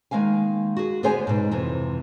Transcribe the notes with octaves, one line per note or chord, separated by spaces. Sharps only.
D#3 G#3 A#3 F5 G#5
F#4 G#4
D3 B3 G#4 C5 C#5 G#5
G#2 B2
F2 C3 E3